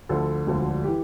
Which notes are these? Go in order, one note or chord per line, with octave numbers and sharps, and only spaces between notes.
D2 D3 F3 A4
E1 D2 D3 F3
E3 G4